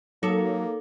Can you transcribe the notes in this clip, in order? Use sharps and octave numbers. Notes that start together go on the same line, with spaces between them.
F#3 A#3 D#4 A4 C#5 D6